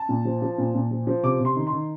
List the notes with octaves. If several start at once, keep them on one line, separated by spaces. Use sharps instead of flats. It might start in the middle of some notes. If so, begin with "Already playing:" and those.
Already playing: A5
A#2
F3
F3
A#2
A#2
F3
F3
C3 D6
C3
C6
D#3
C6
D#3